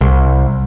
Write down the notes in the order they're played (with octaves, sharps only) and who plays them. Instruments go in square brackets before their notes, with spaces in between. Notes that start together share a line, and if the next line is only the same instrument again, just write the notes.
[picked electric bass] C2